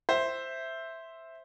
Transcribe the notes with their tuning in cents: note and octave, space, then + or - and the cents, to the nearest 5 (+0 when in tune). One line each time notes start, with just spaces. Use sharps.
C5 +0 E5 +0